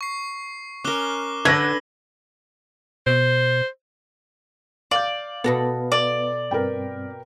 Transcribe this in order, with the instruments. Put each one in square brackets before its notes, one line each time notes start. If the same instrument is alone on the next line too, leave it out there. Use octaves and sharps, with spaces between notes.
[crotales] C#6 C7
[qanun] C#4 A#4 [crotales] D6 F#6 G7
[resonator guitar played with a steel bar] D3 [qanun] B4 [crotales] E6 [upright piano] G#6 A#6
[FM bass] B2 [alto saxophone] C5
[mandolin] D5 [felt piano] F5 G6
[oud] B2 F#4 A4 [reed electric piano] B3 B4
[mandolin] D5
[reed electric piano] G2 C4 [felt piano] A#4 B4 G5